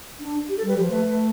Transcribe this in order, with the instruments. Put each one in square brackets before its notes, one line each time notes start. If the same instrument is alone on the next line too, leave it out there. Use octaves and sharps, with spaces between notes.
[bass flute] D4
[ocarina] G4
A4
[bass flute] G3 [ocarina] B4
[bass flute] F3 [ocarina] G4
[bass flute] A3 [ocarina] B4
[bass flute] A3